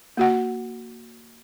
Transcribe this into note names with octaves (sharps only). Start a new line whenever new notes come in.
A#3 F#4 F#5